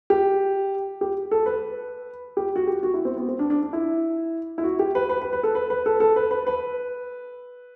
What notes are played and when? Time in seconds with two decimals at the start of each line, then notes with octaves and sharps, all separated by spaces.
0.10 G4
1.01 G4
1.31 A4
1.46 B4
2.37 G4
2.56 F#4
2.67 G4
2.83 F#4
2.94 E4
3.05 C4
3.17 B3
3.28 C4
3.39 D4
3.50 D4
3.63 D4
3.73 E4
4.58 E4
4.64 F#4
4.79 G4
4.95 B4
5.10 B4
5.22 B4
5.33 B4
5.43 A4
5.55 B4
5.70 B4
5.86 A4
6.00 A4
6.16 B4
6.31 B4
6.47 B4